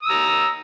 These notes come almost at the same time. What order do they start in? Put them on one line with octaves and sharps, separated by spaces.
D#6 E6 A#5